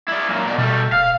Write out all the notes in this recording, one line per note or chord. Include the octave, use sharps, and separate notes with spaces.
E4 D5
F#2 A#2
B2 D5
B2 G3 A3
D1 F5